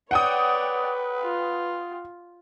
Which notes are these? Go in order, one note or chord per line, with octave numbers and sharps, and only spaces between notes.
B4 C#5 D5 F#5 G5 D#6
F4